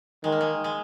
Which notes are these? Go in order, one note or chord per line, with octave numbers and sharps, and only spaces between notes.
D#3 G#3
A#3
G#3
G#3